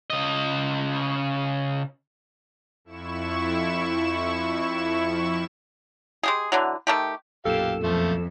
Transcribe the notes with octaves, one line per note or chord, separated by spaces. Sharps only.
C#3 D#5
F2 E4 C#6 E7
G#3 G4 G#4
D3 E3 F#3
D#3 A3 G4
B1 F#2 A#2 G4 A4 F5 E7
F2 F3 A3